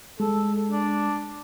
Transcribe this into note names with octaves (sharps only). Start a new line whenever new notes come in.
G#3 A4
D4